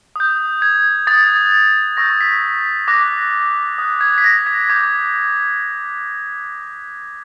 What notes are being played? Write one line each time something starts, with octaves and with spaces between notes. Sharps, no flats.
D#6 G6
G#6
D#6 F#6 A6
C#6 E6 G6 A#6
B6
D6 F#6 A#6
D#6 F#6
G#6
B6
A#6
G#6
D6 G6 G#6